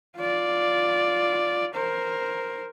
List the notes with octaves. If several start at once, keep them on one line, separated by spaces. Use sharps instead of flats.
F4 D5
A#4 C5